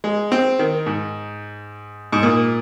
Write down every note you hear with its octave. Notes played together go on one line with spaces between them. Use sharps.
G#3
C4
D#3
G#2
G#2
A#2